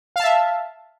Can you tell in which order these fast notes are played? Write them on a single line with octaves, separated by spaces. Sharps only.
F5 A5 E5